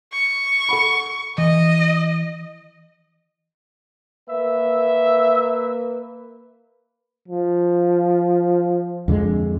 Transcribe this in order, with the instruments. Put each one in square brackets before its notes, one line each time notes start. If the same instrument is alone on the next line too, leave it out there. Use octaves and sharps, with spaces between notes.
[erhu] C#6
[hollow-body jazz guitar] A4 F#5 B5
[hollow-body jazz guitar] E3 [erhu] D#5
[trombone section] A#3 B4 [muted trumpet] E5
[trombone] F3
[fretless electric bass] F2 D3 G#3